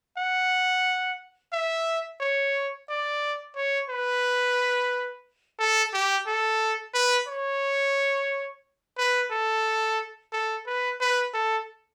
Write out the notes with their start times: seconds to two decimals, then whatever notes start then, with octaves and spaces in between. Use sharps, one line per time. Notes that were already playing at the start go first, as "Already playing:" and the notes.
0.18 F#5
1.53 E5
2.21 C#5
2.89 D5
3.56 C#5
3.90 B4
5.59 A4
5.94 G4
6.27 A4
6.94 B4
7.28 C#5
8.98 B4
9.31 A4
10.33 A4
10.67 B4
11.01 B4
11.34 A4